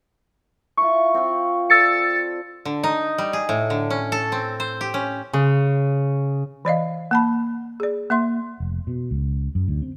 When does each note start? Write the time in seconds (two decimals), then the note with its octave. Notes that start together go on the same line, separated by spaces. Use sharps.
0.77 E4 F4 C#6
1.14 C4 F4
1.70 A4 D5 E6 A6 C#7
2.65 D3
2.84 D#4
3.18 G3
3.33 G#4
3.49 A2
3.70 D3
3.90 C#4
4.12 A4
4.32 C4
4.60 C5
4.81 G4
4.94 C#4
5.33 C#3
6.65 E3 D5 D#5 F5
7.11 A#3 A5 B5
7.80 G#4 D5
8.10 A#3 E5 C6
8.60 F1
8.87 B2
9.11 C#2
9.55 F#2
9.68 D2
9.82 C4